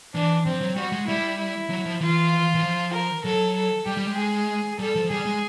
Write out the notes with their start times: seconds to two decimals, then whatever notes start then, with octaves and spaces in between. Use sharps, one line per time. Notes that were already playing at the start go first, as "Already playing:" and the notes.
0.15 E3 D4
0.46 F3 C4
0.61 F#3
0.76 G3 F#4
0.92 G#3
1.07 G3 E4
1.39 E4
1.70 F#3
1.86 F3
2.01 E3 F4
2.55 E3
2.63 F3
2.94 A#4
3.25 F#3 A4
3.56 A4
3.87 G3 G4
3.97 G3
4.07 G#3
4.17 G#4
4.79 G3 A4
4.95 F3
5.10 G3 G#4
5.26 G#3